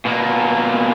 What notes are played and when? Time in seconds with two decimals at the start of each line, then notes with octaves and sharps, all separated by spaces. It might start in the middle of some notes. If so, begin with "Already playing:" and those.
0.05 B2 A#3